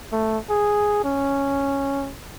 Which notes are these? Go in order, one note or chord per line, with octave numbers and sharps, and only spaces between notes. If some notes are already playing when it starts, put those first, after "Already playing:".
A3
G#4
C#4